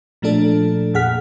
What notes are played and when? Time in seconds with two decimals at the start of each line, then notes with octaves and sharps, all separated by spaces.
0.22 A#2 F3 A3 D4 A4
0.94 F2 A#2 G#4 F#5 F6 B6